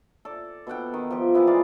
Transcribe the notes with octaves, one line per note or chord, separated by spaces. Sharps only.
A4 D5
B2 A4 F#5 G5
D#3
F3 G4
E3 A#3 B3 E4
G#3 F4 D5 F5